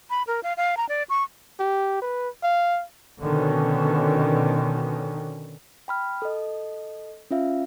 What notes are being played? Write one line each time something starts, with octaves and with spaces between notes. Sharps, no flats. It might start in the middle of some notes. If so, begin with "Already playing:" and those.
B5
A#4
F5
F5
A#5
D5
C#6
G4
B4
F5
B2 D3 D#3 C#4
G5 B5 F6
A4 D#5
C#4 F4 E5 F5